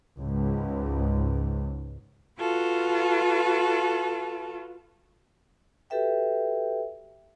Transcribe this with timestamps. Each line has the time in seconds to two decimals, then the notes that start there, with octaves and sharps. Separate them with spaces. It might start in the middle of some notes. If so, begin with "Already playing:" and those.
0.17 C#2 G#2
2.39 F4 F#4 A4 B4
5.90 F#4 G4 A4 B4 E5 G5